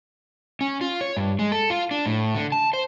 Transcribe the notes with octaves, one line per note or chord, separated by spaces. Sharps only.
C#4
F4
C#5
G2
G#3
A4
F4
D4
A2
D3
A5
C5